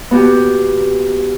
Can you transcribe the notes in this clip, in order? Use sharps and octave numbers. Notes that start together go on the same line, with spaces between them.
B3 F#4 G4